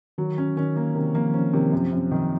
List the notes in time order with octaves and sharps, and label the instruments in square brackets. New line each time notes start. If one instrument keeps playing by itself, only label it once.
[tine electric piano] D#3 [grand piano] F#3
[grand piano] C#4
[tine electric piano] D#3 [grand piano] C#4
[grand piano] A#3
[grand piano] C3 [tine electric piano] D#3
[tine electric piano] F3 [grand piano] A#3
[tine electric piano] F3 [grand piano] C#4
[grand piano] C3 [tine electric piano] D#3
[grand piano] F#2 [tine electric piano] F3
[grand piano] F#2
D#3